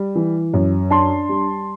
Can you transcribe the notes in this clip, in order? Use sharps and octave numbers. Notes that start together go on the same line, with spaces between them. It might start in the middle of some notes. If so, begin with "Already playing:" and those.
Already playing: G3
E3
F#2
D4 A5 C6
G3